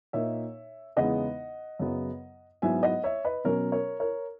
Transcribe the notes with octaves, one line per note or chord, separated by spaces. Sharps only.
A#2 A#3 D#4 C#5 E5
E2 C#3 G#3 B3 D#4 D#5 F#5
F#2 C#3 F#3 B3
G#2 F#3 B3 E4 E5 G#5
D#5 F#5
C#5 E5
B4 D#5
B2 F#3 C#4 A#4 C#5
A#4 C#5
A#4 C#5